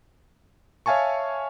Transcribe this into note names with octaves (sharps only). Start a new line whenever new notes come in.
C#5 E5 F5 G#5 A5 C#6